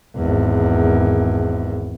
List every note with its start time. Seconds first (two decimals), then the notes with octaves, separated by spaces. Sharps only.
0.16 G#1 E2